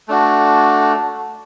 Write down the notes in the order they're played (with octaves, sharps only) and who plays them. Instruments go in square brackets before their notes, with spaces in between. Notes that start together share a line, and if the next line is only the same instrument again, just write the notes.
[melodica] A3 D4 F#4